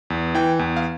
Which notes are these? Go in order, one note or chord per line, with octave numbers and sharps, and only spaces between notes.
E2
E3 G5
E2
F5